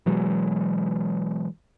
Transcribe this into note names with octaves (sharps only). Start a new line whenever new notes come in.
B2 E3 F#3 G#3